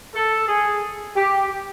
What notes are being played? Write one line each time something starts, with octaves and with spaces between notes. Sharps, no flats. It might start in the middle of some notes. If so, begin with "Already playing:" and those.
A4
G#4
G4